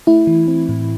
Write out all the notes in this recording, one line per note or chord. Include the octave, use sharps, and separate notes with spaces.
A3 E4
E3
C4
A2